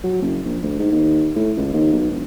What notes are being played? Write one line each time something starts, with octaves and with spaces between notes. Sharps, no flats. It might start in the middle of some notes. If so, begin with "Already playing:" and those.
F#3
F#1
A#1
D2
G#2
D#2
A2
C#2
D#2
B1
E1